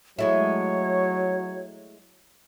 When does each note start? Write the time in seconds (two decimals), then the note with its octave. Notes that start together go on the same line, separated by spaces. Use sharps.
0.19 F#3 G#3 A3 E4 C#5